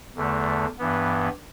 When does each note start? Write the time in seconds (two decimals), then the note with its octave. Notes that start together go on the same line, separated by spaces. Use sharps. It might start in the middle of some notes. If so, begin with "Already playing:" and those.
0.15 E2 D3 A3
0.79 G2 E3 B3